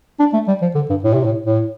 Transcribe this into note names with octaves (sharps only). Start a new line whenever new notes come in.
D4
A3
G3
F3
D3
G2
A2
C3
A2
A2